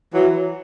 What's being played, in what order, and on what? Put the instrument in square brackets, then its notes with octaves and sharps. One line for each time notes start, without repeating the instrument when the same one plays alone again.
[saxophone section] E3 F#3